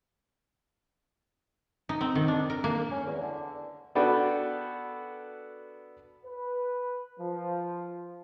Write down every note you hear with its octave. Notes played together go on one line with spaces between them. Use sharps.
D#4
C4
D#3
D4
A#4
A#3
C#4
E2
D3
B3 D4 F#4 A4 B4 G5
B4
F3